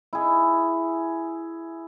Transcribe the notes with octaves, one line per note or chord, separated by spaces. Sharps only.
E4 G#4